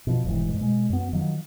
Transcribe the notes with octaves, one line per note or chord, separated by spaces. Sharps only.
B2 F3
E1 C2 G#2 E3
G#2
B2 G#3
F#2 B3
D#3 F3 F#3